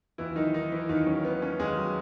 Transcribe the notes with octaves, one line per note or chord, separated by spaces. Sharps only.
D#2 E3 E4
D#3 F#3 D#4
D#3 D#4
E3 A#3 E4
D#2 D#3 D#4
F#3 C#4
D#3 B3
A#3 C#4
D#2 G#3 G#4
F#3